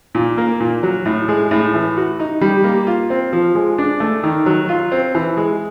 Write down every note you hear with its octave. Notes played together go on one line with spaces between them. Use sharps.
A#2
A#3
A#2
F#3
A2
G#3
A2
E3
F#4
D#4
G3
A#3
F4
C4
F3
G#3
D4
A3
D#3
F#3
F4
C4
E3
G#3